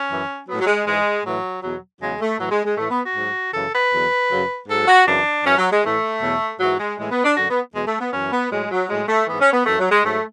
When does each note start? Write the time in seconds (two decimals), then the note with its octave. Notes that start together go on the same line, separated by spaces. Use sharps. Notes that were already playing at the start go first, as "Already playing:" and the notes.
Already playing: C#4
0.10 F#2 E3
0.47 A2 F#3 B3
0.61 F#3
0.67 G#3
0.86 G#2 E3 G#3
1.24 A2 E3 F#3
1.62 E2 B2 F#3
2.01 E2 C#3 F#3 G#3
2.20 A3
2.39 A2 E3 F#3
2.51 G#3
2.65 G#3
2.77 A2 E3 A3
2.89 B3
3.03 F#4
3.16 G#2 F#3
3.53 F#2 C#3 E3 A4
3.73 B4
3.92 E2 D3 F#3
4.30 F#2 C#3 F#3
4.68 G#2 F#3 A4
4.87 F#4
5.07 F#2 C#3 E3 D4
5.45 F#2 E3 C#4
5.57 F#3
5.71 G#3
5.84 A2 E3 A3
6.21 E2 B2 F#3
6.60 G#2 E3 F#3
6.80 G#3
6.98 A2 E3 G#3
7.10 B3
7.24 D4
7.36 F#2 D3 F#3 F#4
7.49 B3
7.74 E2 B2 F#3 G#3
7.87 A3
8.00 B3
8.13 F#2 E3 C#4
8.32 B3
8.51 A2 F#3 G#3
8.70 F#3
8.89 A2 F#3 G#3
9.09 A3
9.27 G#2 E3 B3
9.41 C#4
9.53 B3
9.66 F#2 E3 A3
9.79 F#3
9.91 G#3
10.04 G#2 F#3 A3